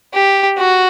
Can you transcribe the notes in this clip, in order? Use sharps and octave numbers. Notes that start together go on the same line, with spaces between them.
G4
F#4